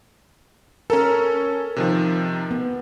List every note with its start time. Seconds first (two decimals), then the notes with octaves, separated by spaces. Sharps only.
0.90 C#4 A4 A#4
1.76 C3 D#3 F3
2.51 B3